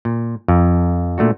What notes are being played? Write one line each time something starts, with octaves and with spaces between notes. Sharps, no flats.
A#2
F2
A#2 A3 D4 F#4